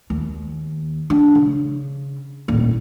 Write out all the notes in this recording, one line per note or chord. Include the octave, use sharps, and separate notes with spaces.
D#2
D4
C#3
D#1 A1